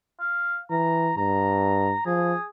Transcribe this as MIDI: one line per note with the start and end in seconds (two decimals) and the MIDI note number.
0.20 0.59 77
0.71 1.12 52
0.71 1.13 82
1.17 1.94 43
1.17 2.04 82
2.06 2.34 53
2.06 2.44 68